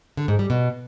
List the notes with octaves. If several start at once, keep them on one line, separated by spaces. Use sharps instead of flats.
D3
G#2
G3
B2